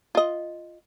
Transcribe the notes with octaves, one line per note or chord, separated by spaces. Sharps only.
F4 D#5